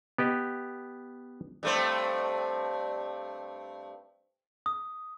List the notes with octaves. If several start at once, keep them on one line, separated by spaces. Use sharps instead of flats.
B3 G4 D#5
G2 A3 C4
D#6